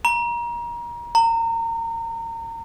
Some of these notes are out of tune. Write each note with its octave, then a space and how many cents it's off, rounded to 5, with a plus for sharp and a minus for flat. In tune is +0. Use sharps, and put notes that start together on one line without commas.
A#5 +30
A#5 -30